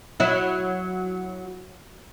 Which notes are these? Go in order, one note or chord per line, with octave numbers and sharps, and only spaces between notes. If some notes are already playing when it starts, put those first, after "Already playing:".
F#3 E4